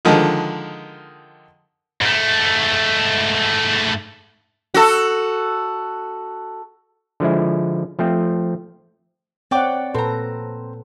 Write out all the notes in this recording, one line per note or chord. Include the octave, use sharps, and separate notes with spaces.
D3 D#3 F3 G#3
G#2 A3
F#4 A4
D3 F3 G#3 E4
F3 A3 C4
C4 C#5 D5 F#5 G5 D6
A#2 C4 A4 B4 A#5